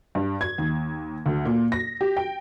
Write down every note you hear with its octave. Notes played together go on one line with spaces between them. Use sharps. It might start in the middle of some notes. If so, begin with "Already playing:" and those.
G2
G#6
D#2
D2
A#2
A#6
G4
G5